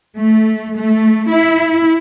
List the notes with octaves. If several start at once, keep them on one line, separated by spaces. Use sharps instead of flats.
A3
A3
E4